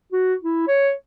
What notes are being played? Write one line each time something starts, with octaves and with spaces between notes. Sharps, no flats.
F#4
E4
C#5